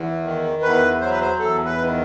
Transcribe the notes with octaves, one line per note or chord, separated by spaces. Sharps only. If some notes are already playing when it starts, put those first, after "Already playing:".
Already playing: E2
D#3
E2 B4
F#3 C5
B4
C5
E2 A4
B4
D#3